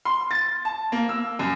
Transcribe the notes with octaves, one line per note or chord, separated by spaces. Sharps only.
C6
A6
A5
A#3
E6
F#2